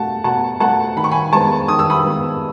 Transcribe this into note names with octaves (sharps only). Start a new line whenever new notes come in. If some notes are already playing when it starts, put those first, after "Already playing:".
Already playing: B2 A3 F#5 A5
B2 F#5 A5
A3 F#5 A5
D#3 B5
C#6
G#5 B5
G#3 B3 A5 C#6
D#3 D#6
E6
B5 D#6
G#3 B3